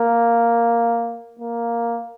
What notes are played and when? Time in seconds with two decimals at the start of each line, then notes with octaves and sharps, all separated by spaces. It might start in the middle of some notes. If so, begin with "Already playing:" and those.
Already playing: A#3
1.39 A#3